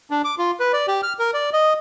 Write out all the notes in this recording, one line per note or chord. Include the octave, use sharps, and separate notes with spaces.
D4
D6
F4
B4
D5
G4
F6
A#4
D5
D#5